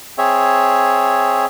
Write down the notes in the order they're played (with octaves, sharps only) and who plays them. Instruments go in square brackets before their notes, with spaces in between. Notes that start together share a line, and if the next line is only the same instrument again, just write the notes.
[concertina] C4 G#4 C#5 E5